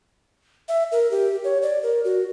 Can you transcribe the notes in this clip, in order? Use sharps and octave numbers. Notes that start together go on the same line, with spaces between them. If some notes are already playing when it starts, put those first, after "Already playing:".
E5
A#4
G4
C#5
D5
A#4
F#4